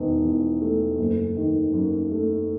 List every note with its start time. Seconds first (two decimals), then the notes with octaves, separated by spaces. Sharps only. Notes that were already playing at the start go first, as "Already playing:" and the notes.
Already playing: E1 D#3
0.23 E2
0.61 A3
0.98 F#1
1.37 D#3
1.73 F#2
2.11 A3